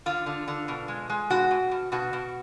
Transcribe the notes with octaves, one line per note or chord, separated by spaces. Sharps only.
D3 F4
D3
D3
B2
G#3
G#3
B2 F#4
B2
B2
B2 F#4
B2